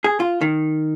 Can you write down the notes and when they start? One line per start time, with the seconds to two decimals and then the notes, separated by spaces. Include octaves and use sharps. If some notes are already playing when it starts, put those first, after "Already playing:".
0.04 G#4
0.20 F4
0.41 D#3